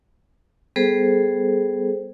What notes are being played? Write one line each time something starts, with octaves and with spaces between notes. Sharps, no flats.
G3 B3 G#4 A4 C5